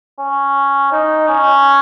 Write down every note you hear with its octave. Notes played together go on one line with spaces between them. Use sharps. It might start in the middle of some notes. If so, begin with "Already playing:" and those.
C#4
D#4
C#4